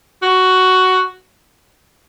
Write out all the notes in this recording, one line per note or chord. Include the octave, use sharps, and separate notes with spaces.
F#4